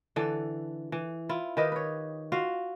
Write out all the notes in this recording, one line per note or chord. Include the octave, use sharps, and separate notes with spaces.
D3 E3 A4
E3
E4 F4
D#3 G4 B4 D#5
B4 C#5
F4 F#4 F5